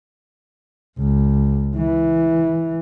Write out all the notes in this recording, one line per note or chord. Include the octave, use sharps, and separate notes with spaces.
C#2
E3